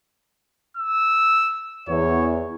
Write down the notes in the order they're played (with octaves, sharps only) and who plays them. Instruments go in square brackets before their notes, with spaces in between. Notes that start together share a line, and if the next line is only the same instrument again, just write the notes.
[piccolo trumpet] E6
[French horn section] E2 [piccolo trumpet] C#5